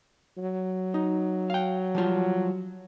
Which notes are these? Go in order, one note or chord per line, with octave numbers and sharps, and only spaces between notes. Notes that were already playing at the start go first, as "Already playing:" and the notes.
F#3
D#4
F5 G5
F3 G3 F4